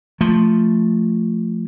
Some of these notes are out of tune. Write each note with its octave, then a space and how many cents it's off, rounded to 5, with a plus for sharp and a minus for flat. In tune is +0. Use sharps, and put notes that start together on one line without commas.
F3 +0 A3 +0